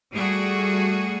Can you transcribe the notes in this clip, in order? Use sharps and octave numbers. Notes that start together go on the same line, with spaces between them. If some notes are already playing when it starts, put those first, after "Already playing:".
G3 A3 F#4 G#4